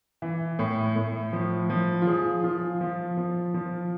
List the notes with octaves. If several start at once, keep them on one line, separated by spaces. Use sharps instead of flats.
E3
A2
A2
F3
F3
F4
F3 G#4
F3 F4
F3
F3
F3